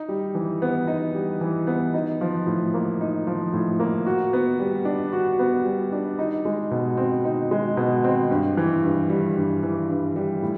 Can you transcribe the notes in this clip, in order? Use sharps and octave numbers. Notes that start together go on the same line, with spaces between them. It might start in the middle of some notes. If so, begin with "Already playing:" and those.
Already playing: D#4
G3
E3
B3
D#4
G3
E3
B3
D#4
F3
A2
A#3
D#4
F3
A2
A#3
F#4
B3
G3
D4
F#4
B3
G3
D4
D#4
G#3
B2
C4
D#4
G#3
B2
C4
G2
E3
G2
G3
G2
E3
G2
G3
A2